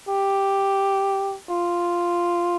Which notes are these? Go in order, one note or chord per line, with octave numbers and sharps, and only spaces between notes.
G4
F4